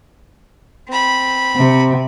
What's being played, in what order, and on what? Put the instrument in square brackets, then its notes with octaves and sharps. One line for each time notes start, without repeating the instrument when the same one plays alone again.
[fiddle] C4 B5
[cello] C3